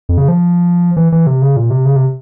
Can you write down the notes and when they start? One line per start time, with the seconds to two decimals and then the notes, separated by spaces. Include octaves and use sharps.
0.09 F2
0.18 C#3
0.28 F3
0.97 E3
1.12 E3
1.27 C3
1.42 C#3
1.56 A#2
1.70 C3
1.86 C#3
1.96 C3